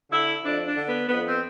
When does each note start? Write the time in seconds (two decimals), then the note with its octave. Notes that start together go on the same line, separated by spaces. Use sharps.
0.10 D3 E4
0.43 F2 D4
0.66 D4
0.76 D3
0.87 B3
1.08 F2 B3
1.26 C4